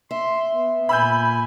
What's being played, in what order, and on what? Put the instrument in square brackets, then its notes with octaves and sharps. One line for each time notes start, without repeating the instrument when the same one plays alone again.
[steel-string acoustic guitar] E5 [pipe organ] C6
[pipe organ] B3
[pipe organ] A#2 G#5 [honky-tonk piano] B5 E6 G6